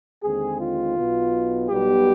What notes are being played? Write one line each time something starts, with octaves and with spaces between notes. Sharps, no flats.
D#2 D3 G#3 C4 G#4
F4
B1 B2 B3
B1 B2 G3 B3 G4